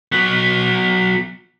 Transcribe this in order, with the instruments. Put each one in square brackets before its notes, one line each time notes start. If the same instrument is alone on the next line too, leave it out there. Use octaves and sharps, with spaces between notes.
[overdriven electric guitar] F#3 B3